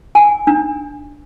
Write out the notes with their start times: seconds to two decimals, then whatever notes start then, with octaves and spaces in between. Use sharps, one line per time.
0.15 G#5
0.47 D4